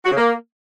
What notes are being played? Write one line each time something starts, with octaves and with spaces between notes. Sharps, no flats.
F#4
C#3
A#3